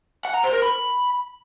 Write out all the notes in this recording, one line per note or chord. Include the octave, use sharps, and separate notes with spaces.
F#5
A#5
C5
A#4
B5